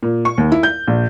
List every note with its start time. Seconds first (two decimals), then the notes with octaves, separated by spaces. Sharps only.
0.03 A#2
0.25 C#6
0.38 D#2
0.52 E4
0.63 G6
0.87 A#1